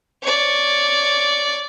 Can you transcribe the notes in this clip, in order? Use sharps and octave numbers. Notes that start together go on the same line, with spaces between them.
C#5 D5